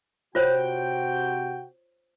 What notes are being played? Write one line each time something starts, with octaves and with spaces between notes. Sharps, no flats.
C3 F4 F#4 C5 C#5 G5